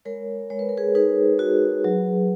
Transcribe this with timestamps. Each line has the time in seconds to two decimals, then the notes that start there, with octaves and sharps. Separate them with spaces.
0.05 G#3 A#4 C#5
0.50 G#3 C#5
0.59 B4
0.69 A#4
0.77 G#4 B4
0.95 D#4 G#4 B4
1.39 F#4
1.84 F#3